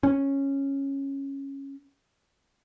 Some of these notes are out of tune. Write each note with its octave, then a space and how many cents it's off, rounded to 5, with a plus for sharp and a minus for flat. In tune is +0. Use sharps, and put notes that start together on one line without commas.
C#4 -10